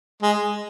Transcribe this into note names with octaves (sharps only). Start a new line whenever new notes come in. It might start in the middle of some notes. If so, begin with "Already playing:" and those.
G#3